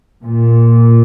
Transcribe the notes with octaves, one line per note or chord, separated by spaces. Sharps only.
A#2